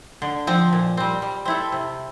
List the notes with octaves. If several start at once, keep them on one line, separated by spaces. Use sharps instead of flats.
D3
F3 C4
A#2
G3 C4
G3
C4 E4 A4
C3